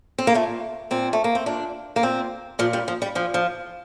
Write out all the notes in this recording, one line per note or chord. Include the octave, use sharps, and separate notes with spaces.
C4
A#3
A#2 A3
A#2 C4
A3
A#3
C4
A#2 D4
A#3
A#2 C4
A#2 F3
G3
F3
G3
A#2 F3
F3